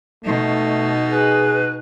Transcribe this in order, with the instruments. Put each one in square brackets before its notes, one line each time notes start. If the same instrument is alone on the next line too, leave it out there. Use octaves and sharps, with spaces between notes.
[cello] B2 D#4 [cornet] A3
[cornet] G#4 [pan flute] B4